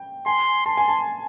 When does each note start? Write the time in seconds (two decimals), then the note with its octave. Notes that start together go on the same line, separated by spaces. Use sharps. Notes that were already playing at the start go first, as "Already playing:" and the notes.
Already playing: G5
0.26 G#5 C6
0.66 A5 C6
0.77 G#5
0.88 A5